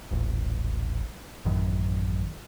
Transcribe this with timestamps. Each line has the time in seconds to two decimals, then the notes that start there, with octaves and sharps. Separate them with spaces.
0.11 D#1 A1
1.45 A1 F#2 D#3